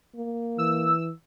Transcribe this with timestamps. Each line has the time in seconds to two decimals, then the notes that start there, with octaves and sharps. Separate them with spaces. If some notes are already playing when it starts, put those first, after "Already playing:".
0.16 A#3
0.58 E3 E6